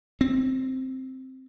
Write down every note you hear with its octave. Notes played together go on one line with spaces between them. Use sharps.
C4